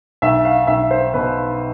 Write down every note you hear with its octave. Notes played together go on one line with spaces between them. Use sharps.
B1 E5
F5
B1 E5
C5
B2 B4